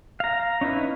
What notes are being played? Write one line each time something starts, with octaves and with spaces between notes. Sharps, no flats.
F5 A#5
C#4 D#4 E4 B4